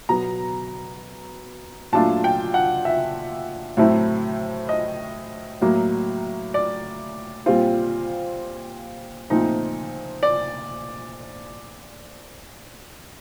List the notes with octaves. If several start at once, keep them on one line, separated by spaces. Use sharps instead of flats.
B2 F#3 B3 A#5
A#2 F#3 A3 D4 F4 A5
G5
F#5
E5
A2 F#3 A3 C4 E4
D#5
A2 F#3 A#3
D5
A#2 G3 C4 F4
A#2 F3 A3 C4 D#4
D5